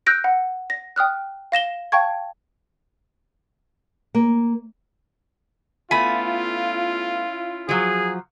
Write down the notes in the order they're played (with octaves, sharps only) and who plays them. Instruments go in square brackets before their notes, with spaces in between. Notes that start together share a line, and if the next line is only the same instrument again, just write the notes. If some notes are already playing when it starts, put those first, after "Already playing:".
[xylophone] E6 F#6 G6 A#6 D7
F#5
A#6
G5 D#6 F6 F#6
F5 A#6 E7 G7
F5 G5 A5 C#6 G#6
[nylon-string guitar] A#3
[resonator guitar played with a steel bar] A3 B3 G#5 [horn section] C#4 E4 F4 [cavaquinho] B5
[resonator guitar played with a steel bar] F3 F#3 [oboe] G#4